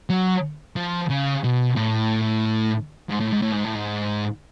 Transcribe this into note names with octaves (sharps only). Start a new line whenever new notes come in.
F#3
F3
C#3
B2
A2
G#2
A2
G#2
A2
G#2
A2
G#2